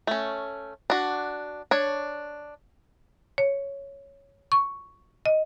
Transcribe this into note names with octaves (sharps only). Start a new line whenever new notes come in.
A3 C#4
D4 F#4
D4 C#5
C#5
C#6
D#5